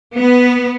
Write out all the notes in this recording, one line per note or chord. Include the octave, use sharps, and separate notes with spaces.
B3